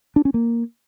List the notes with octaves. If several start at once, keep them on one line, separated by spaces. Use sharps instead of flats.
D4
C#4
A#3